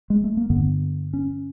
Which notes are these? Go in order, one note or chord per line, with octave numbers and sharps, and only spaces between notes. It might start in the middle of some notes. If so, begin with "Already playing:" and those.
G#3
A3
A#3
G2 D3 B3
C#4